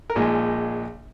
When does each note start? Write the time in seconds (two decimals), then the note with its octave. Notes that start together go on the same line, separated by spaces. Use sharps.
0.10 A#4
0.16 A#1 A#2 G#3 D#4 G#4